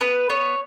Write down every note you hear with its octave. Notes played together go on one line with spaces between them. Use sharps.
B3 B4
B3 C#5